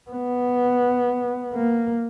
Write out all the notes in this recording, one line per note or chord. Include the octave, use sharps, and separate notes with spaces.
B3
A#3